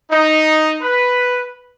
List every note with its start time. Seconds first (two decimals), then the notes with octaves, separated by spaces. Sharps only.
0.11 D#4
0.82 B4